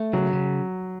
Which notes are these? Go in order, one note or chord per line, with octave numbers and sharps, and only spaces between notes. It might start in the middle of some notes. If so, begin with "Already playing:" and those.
Already playing: A3
C#3 F#3
C#3